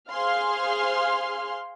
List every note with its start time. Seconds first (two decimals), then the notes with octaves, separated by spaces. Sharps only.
0.11 G#4 C5 F5 C6 F6